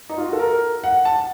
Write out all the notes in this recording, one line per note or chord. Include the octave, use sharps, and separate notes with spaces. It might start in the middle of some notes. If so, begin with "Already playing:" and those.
D#4
F4
F#4
A4
A#4
F#5
A5